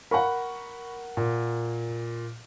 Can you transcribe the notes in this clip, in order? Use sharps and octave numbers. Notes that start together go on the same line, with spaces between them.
A#4 F#5 B5 C#6
A#2